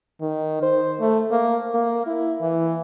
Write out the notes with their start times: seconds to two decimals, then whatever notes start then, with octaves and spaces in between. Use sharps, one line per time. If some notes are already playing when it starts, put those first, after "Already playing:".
0.21 D#3
0.62 C5
1.00 A3
1.31 A#3
1.74 A#3
2.07 E4
2.41 E3